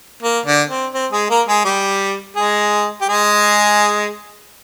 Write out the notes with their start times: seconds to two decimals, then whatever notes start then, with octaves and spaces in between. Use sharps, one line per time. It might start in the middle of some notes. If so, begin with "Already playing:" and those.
0.23 A#3
0.46 D3 D4
0.70 C4
0.94 C4
1.12 G#3 G#4
1.29 A#3 A#4
1.48 G#3 G#4
1.65 G3 G4
2.36 G#3 G#4
3.01 G4
3.08 G#3 G#4